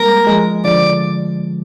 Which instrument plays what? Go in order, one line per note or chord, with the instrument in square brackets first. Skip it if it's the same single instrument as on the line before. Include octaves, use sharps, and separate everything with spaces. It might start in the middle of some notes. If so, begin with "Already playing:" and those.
Already playing: [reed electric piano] G3 G#3 A#3 [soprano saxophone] A#4
[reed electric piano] F3 G#3
[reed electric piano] D3 F3 [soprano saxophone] D5